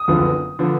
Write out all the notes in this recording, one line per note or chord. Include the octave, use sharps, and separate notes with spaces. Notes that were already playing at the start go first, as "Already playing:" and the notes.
Already playing: D#6
F#1 F2 D3 F3 B3
D3 F3 B3